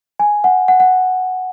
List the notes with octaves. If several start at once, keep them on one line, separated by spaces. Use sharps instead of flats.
G#5
F#5
F#5
F#5